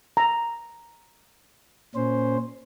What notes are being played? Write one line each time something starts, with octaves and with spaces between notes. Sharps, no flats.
A#5
A#2 C#4 C5